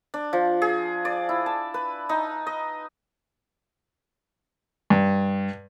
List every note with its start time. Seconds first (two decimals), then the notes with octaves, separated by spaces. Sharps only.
0.14 D4
0.33 F3
0.62 G#4
1.05 D5
1.29 E4
1.46 A5
1.74 B4
2.09 D#4
2.47 D#5
4.90 G2